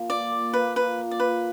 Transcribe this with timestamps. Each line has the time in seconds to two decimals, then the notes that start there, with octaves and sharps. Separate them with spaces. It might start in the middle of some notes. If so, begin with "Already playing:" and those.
Already playing: F3 A#3
0.09 A#2 D5
0.31 A#2
0.53 A#3 B4
0.76 F3 B4
0.98 A#2
1.11 D5
1.20 A#2 B4